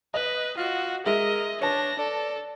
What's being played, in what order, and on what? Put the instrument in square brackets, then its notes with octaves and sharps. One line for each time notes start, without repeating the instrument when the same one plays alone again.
[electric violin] B4 [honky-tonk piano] D#5
[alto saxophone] F4 [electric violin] F#4
[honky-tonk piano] G#3 E5 [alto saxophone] A#4 [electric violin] D#5
[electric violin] D4 A#6 [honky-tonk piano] B4 A5 [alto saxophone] C#5
[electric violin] A4 [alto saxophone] D5